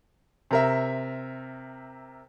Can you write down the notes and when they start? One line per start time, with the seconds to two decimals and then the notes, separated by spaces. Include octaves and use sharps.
0.51 C3 A#4 E5